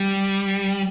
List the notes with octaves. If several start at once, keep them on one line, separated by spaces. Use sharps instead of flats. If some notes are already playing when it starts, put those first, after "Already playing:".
Already playing: G3